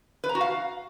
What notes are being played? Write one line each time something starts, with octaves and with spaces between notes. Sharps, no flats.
B4
A#5
F#4
F5